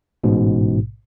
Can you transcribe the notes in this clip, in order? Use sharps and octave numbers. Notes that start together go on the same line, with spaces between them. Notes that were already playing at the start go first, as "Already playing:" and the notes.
A1 G#2 B2